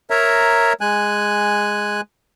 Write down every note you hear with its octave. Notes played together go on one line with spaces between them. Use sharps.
A#4 C#5 E5 A#5
G#3 G#5 F#6